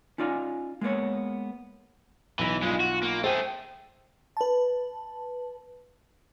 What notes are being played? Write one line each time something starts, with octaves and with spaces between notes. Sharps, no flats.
C#4 D#4 F4 D5 F5 G#5
G#3 A#3 B3 C#5
B1 E3 B5 A#6
G2 G#3 F4
F#4
A#3
A3 G#4 C5 G5
B4 A5